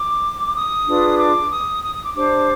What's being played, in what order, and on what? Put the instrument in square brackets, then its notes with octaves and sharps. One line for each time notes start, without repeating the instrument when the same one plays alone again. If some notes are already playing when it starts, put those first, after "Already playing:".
Already playing: [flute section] D6
D#6
D4 F4 G#4 B4
D6
D#6
D#6
D#6
D6
D4 G4 C5 D6